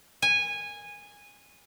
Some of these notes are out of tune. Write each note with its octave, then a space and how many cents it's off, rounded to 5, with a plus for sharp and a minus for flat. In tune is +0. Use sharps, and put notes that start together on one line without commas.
G#5 -15